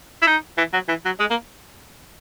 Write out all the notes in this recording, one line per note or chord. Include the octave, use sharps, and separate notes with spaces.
E4
D#4
E3
F#3
E3
F#3
G#3
A#3